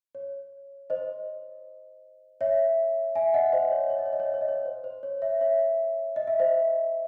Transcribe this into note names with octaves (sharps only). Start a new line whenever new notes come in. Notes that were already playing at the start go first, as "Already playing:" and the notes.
C#5
C5 D#5
C#5 E5
E5 G#5
D#5 F#5
C5 D#5
C#5
C#5
D#5
C#5
D#5
C#5
D#5
C#5
D#5
C#5
C5
C5
C#5
C#5 E5
C#5 E5
D#5
E5
C5 D#5